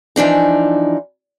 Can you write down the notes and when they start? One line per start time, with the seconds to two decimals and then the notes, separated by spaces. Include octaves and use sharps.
0.16 E3 F3 D4 D#4